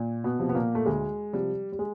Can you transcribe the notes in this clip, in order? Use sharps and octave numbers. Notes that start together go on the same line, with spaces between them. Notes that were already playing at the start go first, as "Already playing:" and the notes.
Already playing: A#2
B2 B3
C3 F3
B3
A#2 A#3
A3
D2 G#3
C3 F3 G3
G3
G#3